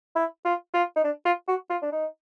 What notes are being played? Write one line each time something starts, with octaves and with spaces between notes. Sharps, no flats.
E4
F4
F4
D#4
D4
F4
F#4
F4
D4
D#4